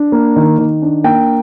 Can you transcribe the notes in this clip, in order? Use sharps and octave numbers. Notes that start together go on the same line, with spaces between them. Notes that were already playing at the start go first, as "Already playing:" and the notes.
Already playing: D4
A#3
D#3
D#3
D4
A#3 G5